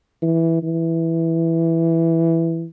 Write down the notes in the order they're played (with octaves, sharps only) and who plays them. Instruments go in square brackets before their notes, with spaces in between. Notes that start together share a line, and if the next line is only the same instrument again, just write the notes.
[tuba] E3
E3